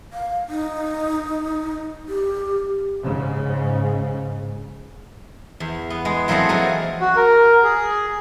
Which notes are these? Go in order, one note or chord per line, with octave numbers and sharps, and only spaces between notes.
F5
D#4
G4
G#2 C#3
E2
B3
G#3
E3 F#3 A#3 C4 G#4 A4
F3 F#4 A#4 F5 G#5 A#5
F#4
A#4
G#4